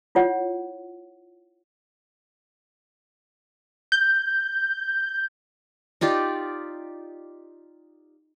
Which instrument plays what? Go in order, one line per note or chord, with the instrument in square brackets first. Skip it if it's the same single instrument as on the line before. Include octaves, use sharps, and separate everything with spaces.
[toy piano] E4 F4 C#5 F#5
[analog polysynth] G6
[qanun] D#4 F4 G4 D5